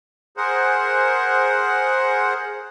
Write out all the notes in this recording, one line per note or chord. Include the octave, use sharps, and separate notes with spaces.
G#4 A#4 C5 F#5